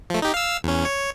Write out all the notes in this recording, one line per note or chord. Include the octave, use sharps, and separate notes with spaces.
F3 A3
D#4 G4
F5 E6
E2 C#4
C#5